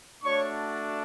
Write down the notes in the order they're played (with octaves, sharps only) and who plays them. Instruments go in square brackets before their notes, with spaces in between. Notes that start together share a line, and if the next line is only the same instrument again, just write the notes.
[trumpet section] A3 D4 F#4 C#5 C#6